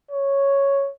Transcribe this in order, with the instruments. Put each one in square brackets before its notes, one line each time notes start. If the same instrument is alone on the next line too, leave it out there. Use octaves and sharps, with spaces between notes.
[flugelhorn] C#5